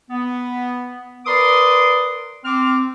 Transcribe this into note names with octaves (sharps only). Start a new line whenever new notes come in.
B3
A#4 B4 D5 C6 D6 D#6
C4 D6 F6